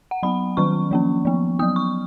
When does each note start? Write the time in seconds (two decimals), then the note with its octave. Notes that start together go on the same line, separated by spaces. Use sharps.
0.11 F#5
0.23 F#3 B3 B5
0.57 D#3 F#3 C#4 C#6
0.91 F3 A#3 C#4
1.25 F3 B3
1.59 F#3 B3 D#6
1.76 C#6